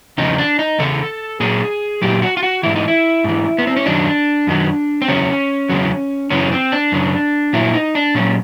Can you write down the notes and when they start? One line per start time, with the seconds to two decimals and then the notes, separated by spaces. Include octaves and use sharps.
0.18 E2 C#3 F3 D#4
0.38 D4
0.59 D#4
0.79 E2 C#3 A4
1.40 A#2 F#3 G#4
2.02 A#2 F#3 G4
2.22 F#4
2.37 F4
2.43 F#4
2.63 G#2 E3 E4
2.76 D#4
2.88 E4
3.24 G#2 E3
3.58 B3
3.67 C4
3.76 C#4
3.86 F#2 D#3 F#3 D4
4.47 F#2 D#3 F#3
5.02 C4
5.08 E2 C#3 F#3 C#4
5.69 E2 C#3 F#3
6.30 F#2 C#3 E3 C#4
6.52 C4
6.72 D4
6.92 F#2 C#3
7.53 A#2 F#3 E4
7.74 D#4
7.95 D4
8.15 A#2 F#3 C#4